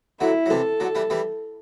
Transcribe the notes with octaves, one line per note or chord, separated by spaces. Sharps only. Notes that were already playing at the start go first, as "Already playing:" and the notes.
D3 F#3 E4
F#3
C3 E3 A4
D3 F#3
E3 G3
E3 G3